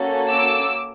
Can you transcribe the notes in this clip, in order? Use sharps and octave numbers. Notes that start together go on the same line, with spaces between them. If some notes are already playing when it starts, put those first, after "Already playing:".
Already playing: A#3 C#4 F#4 A4
D6 E6